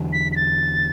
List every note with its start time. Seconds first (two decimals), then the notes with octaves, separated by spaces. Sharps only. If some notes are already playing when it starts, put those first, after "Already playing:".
Already playing: E2 D3 F#3
0.13 B6
0.32 B6
0.36 A6